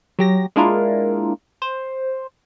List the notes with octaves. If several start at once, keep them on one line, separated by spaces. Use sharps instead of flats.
F#3 G4 A#6
G#3 A#3 D4 E4 F4 A#4
C5